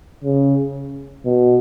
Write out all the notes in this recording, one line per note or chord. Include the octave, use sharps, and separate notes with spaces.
C#3
B2